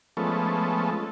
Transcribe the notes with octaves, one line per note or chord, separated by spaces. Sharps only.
F3 G#3 A3 B3 C#4 A4